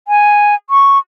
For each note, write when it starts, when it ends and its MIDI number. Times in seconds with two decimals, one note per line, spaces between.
0.08 0.55 80
0.70 0.99 85